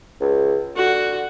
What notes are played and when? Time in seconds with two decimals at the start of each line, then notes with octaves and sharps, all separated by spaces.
0.21 C#2
0.76 D3 F#4